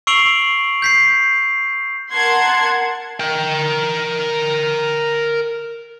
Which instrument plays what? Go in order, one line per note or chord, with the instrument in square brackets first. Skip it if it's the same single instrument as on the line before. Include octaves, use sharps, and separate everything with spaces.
[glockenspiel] C#6 E6 C7 D7 F7 F#7
G6 B6 C7
[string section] A#4 F#5 A5 C6 G#6
[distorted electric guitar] A#4 G5